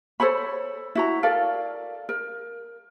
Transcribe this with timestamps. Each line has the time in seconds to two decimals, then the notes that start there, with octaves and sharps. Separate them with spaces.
0.20 A4 C5 C#5 B5
0.95 E4 F#4 A#5
1.23 A4 A#4 D5 F5
2.09 A#4